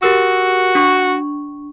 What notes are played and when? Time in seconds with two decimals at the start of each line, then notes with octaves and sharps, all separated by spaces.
0.03 F#4 G4 A#4 E6
0.75 D4 C#6